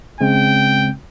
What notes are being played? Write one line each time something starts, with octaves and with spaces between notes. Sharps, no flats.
C#3 G#3 C4 G5